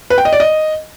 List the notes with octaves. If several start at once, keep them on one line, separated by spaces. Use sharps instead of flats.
B4
G5
D#5
D5
D#5